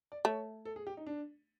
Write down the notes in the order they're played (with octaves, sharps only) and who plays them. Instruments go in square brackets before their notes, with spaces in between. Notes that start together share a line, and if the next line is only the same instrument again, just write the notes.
[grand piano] D5
[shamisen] A3 [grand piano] C#5
[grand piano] A4
G#4
G4
D#4
D4